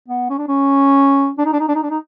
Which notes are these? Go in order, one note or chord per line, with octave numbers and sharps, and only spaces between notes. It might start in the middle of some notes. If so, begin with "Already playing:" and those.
B3
C#4
D4
C#4
D4
D#4
D4
D#4
D4
D#4
D4
D#4